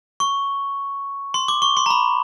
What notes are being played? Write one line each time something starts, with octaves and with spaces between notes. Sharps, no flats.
C#6
C6
D6
C#6
C6
A#5
B5